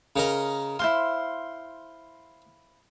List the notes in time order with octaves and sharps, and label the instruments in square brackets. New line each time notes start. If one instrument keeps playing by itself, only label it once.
[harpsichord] C#3 A#4 D#5
[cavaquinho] E4 C5 F5 [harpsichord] C6